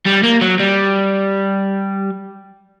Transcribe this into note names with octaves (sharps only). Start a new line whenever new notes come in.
G3
A#3
F#3
G3